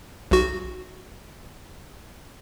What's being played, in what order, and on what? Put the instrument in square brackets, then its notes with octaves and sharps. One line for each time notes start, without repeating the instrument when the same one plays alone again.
[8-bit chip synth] B1 F#4